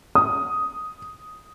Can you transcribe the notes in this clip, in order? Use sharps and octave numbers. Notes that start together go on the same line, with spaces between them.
D#6